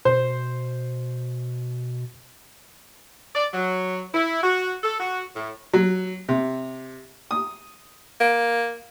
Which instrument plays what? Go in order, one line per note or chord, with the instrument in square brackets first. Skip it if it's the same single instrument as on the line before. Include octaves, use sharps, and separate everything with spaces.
[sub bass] B2 [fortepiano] C5
[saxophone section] D5
F#3
E4
F#4
A4
F#4
A2
[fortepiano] F#3
C3
D#6
[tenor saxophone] A#3